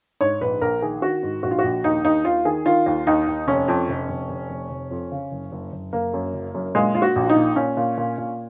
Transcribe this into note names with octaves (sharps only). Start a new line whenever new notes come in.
G#2 C#5
A#1 B4
A#1 A#4
D#3 G#4
D#3 F#4
G#2
A#1 F#4
F4
F#4
A#1
D#2 D#4
D#2 D#4
D#2 F4
D#3 G#4
D#3 F4
D#2
D#2 D#4
D#2
F1 C#4
F2
F1
F1
F1
F1
F1
F2
C#3
F#1
F#1
F#1
F#1 A#3
F#2
F#1
F#2
A#2 G#3
A#2 F4
F#4
A#1
F4
D#4
A#2
A#2 C#4
A#2
A#2
A#2